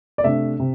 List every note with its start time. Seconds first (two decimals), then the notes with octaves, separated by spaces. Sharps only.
0.18 D5
0.24 C3 A3 D4 E5
0.59 C3